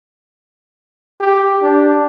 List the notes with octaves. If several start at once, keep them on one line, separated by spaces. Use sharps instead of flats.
G4
D4